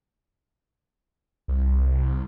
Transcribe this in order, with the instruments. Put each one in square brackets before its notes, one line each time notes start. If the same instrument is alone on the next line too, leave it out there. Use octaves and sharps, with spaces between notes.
[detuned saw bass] C2